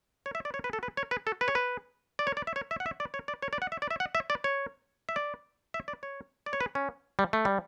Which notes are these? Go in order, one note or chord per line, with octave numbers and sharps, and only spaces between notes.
C#5
E5
D5
C#5
B4
A4
B4
C#5
B4
A4
B4
C#5
B4
D5
C#5
D5
E5
C#5
E5
F#5
E5
D5
C#5
D5
C#5
D5
F#5
E5
D5
E5
F#5
E5
D5
C#5
E5
D5
E5
D5
C#5
D5
C#5
B4
C#4
G3
A3
G3